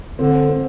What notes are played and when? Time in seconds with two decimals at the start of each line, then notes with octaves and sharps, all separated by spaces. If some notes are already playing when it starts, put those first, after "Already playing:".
0.19 D3 C4
0.49 C4